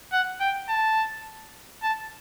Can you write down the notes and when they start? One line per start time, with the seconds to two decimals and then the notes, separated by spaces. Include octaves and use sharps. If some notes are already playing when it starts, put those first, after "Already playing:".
0.13 F#5
0.40 G5
0.69 A5
1.83 A5